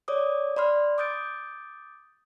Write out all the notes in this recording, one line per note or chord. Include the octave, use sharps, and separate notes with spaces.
C#5 D5 D6 D#6
D5 B5 C6 F6
D6 D#6 G6 A6 D7